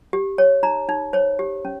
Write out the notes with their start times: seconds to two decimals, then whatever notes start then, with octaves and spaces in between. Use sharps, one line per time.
0.13 G4
0.38 C#5
0.63 D#4 A#5
0.89 D#4
1.13 C5 C#5
1.39 G4
1.65 C#4